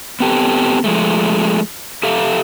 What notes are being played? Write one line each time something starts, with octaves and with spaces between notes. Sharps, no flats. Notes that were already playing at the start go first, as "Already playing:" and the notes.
B3 C4 G4 A4
F3 G#3 A3
G4 A4 E5 F5